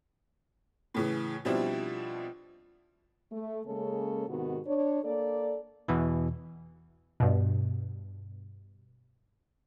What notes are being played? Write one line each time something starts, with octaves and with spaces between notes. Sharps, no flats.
A2 C#3 E3
B2 F3 G3 C4 D4 E4
A3
C#3 G#3 A#3 C#4 A4
G#2 C3 D#3 B3 F#4
D4 C#5
A#3 A4 D5
E2 B2 E3
G2 B2